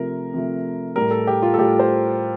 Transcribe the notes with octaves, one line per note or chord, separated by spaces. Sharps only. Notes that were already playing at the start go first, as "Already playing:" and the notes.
Already playing: C3 F3 A3 A#4
C3 F3 A3
A2 G3 A#4
A4
G4
F4
A4
A2 G3 G4
C5